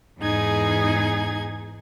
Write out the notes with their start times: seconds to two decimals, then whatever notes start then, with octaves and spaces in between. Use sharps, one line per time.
0.20 E2 G#2 D#4 G#4 G#6